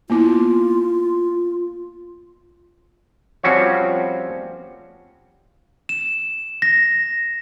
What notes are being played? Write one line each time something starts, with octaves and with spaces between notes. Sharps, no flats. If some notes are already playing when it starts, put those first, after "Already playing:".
A#3 B3 E4 F4
F3 G3 C4 C#4 F#4 C#5
E7
A#6